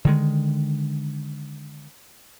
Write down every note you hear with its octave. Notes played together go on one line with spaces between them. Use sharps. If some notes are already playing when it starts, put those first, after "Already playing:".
D3 D#3 G#3